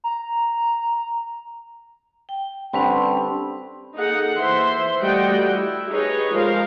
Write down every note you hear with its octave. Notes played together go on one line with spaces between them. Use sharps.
A#5
G5
D3 G3 C4 C#4 B4 A5
A#3 D#4 G#4 A4 F#5
E3 C5 E5 C6
G3 A3 F#4 D#5 F#5 G5
E4
D#4 G4 G#4 B4 C#5 D#5
F3 G#3 A#4 C5 F5